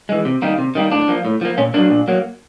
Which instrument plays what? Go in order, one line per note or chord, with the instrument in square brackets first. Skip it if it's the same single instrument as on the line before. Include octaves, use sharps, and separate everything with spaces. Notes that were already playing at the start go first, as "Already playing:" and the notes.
[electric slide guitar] E3 G#3
C3
D#3 G3 A#3
C3
D#3 G3 A#3
A2 D4
F3 A#3
A2
F3 A#3
A#2 C#4
F#3 A#3 D4
A#2
F#3 A#3